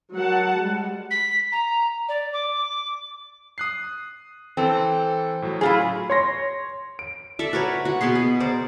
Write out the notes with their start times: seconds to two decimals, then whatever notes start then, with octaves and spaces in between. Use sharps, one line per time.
0.13 F#3 A#4 F#5 A5
0.57 G3 G#3
1.10 B6
1.52 A#5
2.08 D5
2.33 D6
3.58 D#6 F#6 C7
4.57 E3 C4 A4
5.42 A2 F#3
5.61 E4 F4 G#4
6.10 C#5 C6 A#6
6.99 D7
7.39 A4 D5 E5
7.53 F#4 A#4 B4 C#5
7.85 F#4
8.01 B2 B3 G#4 C6
8.15 G#4
8.40 A#4 C5 D5